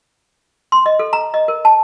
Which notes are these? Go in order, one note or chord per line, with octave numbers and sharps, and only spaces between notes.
C6
D#5
A4
A#5
D#5
A#4
A5